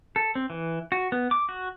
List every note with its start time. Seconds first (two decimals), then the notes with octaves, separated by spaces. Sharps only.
0.16 A4
0.35 C4
0.50 E3
0.92 F#4
1.12 B3
1.31 D6
1.49 F#4